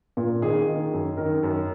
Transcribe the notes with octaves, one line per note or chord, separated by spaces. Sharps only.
A#2
D#3 G#4
D#3
F#2
D#3 A#4
F#2